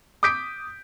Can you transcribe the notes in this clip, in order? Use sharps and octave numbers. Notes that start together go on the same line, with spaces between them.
D6 D#6 G6 B6 D7